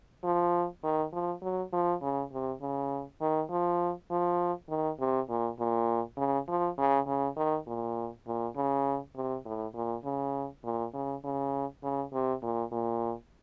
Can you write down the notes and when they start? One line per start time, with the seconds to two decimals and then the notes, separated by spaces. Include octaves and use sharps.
0.24 F3
0.84 D#3
1.13 F3
1.42 F#3
1.73 F3
2.02 C#3
2.32 C3
2.62 C#3
3.21 D#3
3.50 F3
4.11 F3
4.69 D#3
5.00 C3
5.29 A#2
5.59 A#2
6.18 C#3
6.48 F3
6.78 C#3
7.07 C#3
7.37 D#3
7.67 A#2
8.27 A#2
8.56 C#3
9.16 C3
9.45 A2
9.74 A#2
10.05 C#3
10.64 A#2
10.94 C#3
11.24 C#3
11.83 C#3
12.13 C3
12.43 A#2
12.72 A#2